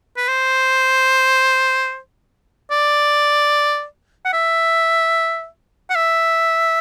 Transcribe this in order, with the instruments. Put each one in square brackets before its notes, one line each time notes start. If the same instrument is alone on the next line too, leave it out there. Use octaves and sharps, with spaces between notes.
[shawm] B4
C5
D5
F#5
E5
F#5
E5